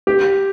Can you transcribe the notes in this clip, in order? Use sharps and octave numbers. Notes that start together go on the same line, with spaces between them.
G4